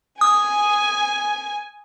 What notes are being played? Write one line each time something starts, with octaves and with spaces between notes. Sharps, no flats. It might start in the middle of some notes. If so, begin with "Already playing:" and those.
G#5 D#6